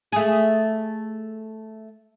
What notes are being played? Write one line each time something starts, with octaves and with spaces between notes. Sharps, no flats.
A3 G#4